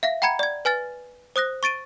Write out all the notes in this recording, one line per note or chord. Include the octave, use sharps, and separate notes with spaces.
E5 F5 A#6
F#5 G5 A#5 B5 G#6 C#7
D5 G#6
B4 G#5 F6 A6
C5 D#6 F#6 A#6
C#6 A6 D7 D#7